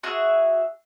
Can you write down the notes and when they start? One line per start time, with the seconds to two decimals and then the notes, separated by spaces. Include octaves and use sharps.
0.03 F#4 G#4 E5